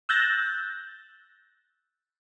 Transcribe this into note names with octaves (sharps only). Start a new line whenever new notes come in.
E6 F#6 G6 A6 A#6